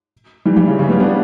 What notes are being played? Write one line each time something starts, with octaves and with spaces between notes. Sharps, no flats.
E3 G3
E3 G3
C#3
C#3
G3 B3
B3 D4